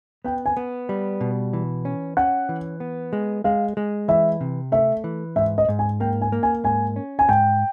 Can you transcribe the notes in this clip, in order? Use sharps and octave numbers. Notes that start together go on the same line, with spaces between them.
B3 G5
G#5
B3
G3
B2
E3
C#4
C#4 F#5
E3
B3
G#3
G#3 F5
G#3
E3 E5
C3
A3 E5
E3
G#2 E5
D#5
G#2
G#5
A#3 G5
G#5
A#3
G#5
G#2 G#5
C#4
G#5
G#2 G5